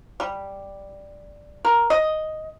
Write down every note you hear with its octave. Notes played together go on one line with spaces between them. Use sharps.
G3
A#4
D#5